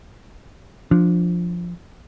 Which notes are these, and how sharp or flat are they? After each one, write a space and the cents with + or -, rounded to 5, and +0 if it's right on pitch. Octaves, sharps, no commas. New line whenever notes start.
F3 +0 D4 +0